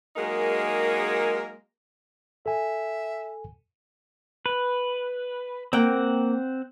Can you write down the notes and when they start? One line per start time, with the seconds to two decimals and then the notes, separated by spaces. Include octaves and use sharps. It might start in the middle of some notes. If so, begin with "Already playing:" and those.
0.16 F#3 G#3 A#3 D#4 G#4 A#4
2.46 A4 E5 G#5
4.46 B4
5.73 A#3 C4 F#5 G5